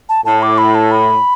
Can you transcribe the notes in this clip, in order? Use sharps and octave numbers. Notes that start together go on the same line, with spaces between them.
A5
A2 A5
D6
B5
A5
B5